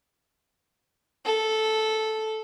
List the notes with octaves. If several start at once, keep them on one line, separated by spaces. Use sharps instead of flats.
A4